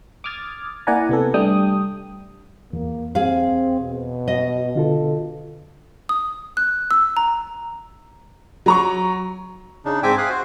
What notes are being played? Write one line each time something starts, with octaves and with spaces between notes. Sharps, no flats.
D6 D#6 F6 G#6 A6
A#3 E4 D5 F#5 G#5 A#5
C3 B3 A4
G3 A3 D4 G5 D#6
E2 A#3
C4 G#4 F5
B2
D#5
D3 F4 A4
D#6
F#6
E6
A#5
F#3 A#5 C#6
C#3 D4 D#4
G#2 C4 E5 G5 G#5 D6
F5 G#5 D#6 F#6
F#4 C5